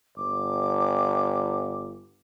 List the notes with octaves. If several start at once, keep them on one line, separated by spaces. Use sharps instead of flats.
G1 D6